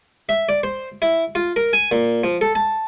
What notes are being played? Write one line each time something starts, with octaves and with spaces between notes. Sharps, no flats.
E5
D5
C5
E4
F4
A#4
G#5
A#2
F3
A4
A5